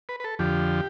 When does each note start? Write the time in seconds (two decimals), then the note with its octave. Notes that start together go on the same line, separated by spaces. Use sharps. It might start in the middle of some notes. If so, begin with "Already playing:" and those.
0.09 B4
0.20 B4
0.24 A4
0.39 F2 D3 F3 G4